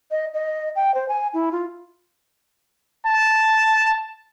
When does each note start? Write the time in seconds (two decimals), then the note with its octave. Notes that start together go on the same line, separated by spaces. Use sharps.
0.11 D#5
0.34 D#5
0.76 G5
0.94 C5
1.08 G#5
1.34 E4
1.52 F4
3.07 A5